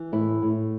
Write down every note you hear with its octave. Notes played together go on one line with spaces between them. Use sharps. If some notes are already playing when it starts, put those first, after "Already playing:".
Already playing: E3
A2 E4
A2